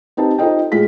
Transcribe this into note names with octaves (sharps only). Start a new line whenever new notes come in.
C4 D#4 G4 B4 A5
D#4 F4 A4 C5 D#5 G5
A2 G#3 F4 B6